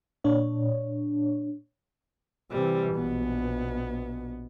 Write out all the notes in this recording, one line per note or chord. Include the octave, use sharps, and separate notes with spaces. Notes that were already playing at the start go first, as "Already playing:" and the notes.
A#2 D4 C#5
C3 E3 G3
A#1 B2 B3